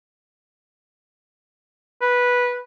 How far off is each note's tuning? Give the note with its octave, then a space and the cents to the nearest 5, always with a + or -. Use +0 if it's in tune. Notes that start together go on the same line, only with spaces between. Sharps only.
B4 -10